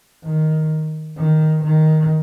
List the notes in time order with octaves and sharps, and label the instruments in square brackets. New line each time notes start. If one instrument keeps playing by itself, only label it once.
[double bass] D#3
D#3
D#3